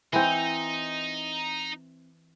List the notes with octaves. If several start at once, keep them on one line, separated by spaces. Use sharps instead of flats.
E3 C4 D#4